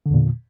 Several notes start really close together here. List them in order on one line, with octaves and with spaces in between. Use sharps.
D3 E2 A#2